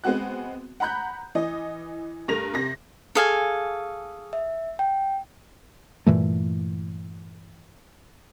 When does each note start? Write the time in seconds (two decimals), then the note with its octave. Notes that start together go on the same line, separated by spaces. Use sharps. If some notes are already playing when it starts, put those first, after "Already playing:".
0.04 G#3 B3 C4 F#4 F#6
0.80 F#5 A#5 B5 F#6 G6
1.35 E3 D#5
2.28 G2 A3 A#4 A#6 F7
2.54 C3 A#6
3.15 G#4 A4 F5 G#5 D#6
4.33 E5
4.79 G5
6.06 G2 A#2 E3 A3